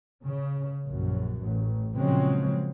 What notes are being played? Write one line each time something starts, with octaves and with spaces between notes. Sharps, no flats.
C#3
A#1 F#2
A1
A#2 C#3 F3 F#3 G#3 C4